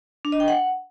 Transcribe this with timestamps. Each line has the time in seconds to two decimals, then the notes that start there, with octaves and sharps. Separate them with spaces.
0.25 D4
0.32 D#5
0.40 G5
0.48 F#5